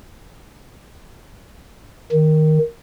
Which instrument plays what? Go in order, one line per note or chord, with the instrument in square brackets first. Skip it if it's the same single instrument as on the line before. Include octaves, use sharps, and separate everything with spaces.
[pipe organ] D#3